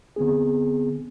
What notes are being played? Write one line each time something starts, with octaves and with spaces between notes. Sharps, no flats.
D3 B3 C4 G#4